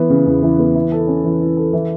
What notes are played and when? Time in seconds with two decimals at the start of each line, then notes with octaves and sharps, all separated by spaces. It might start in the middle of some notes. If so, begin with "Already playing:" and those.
Already playing: E3 B3
0.10 C#3
0.26 E2
0.43 E3
0.59 B3
0.75 E4
0.92 A4
1.08 C#4
1.24 E3
1.41 E4
1.57 A4
1.73 E3